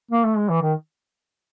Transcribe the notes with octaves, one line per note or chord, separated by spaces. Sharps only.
A#3
A3
G#3
E3
D#3